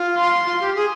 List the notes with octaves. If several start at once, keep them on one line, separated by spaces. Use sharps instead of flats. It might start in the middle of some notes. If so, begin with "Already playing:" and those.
Already playing: F4
C6
F4
G4
G#4